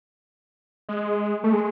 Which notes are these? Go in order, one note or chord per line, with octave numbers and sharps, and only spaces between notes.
G#3
A3
G#3